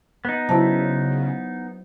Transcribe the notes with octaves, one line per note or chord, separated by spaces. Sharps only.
B3 D#4
C#3 F#3 E4 C5 E5 A5